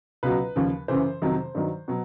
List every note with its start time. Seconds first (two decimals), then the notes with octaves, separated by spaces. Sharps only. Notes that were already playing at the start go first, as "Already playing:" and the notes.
0.23 C#2 B2 F#3 B4
0.56 D#2 C#3 F3
0.88 F#2 C#3 E3 C5
1.22 F2 C3 D#3 F#3
1.55 G2 D#3 F#3
1.88 B2 F#3